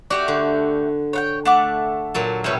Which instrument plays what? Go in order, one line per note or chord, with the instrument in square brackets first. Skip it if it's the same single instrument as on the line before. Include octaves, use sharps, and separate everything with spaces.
[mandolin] A3 G4 D5 [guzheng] F#4
[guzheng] D3
[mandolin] C#5 F#5 G5
A3 F#5 D6
[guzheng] A#2 F#3 A5
[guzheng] B2 G3 [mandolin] E4 G4 C#5